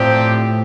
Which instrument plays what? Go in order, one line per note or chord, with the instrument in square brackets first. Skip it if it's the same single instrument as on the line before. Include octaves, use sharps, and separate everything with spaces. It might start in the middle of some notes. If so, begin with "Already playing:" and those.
Already playing: [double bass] A2 [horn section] C3 F3 C4 G4 D5